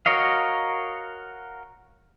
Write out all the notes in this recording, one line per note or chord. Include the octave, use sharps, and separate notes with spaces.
F#4 A#4 C#5 D#5 F5